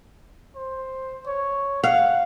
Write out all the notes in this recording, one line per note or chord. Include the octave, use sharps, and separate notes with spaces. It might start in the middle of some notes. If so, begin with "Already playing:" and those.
C5
C#5
F5 F#5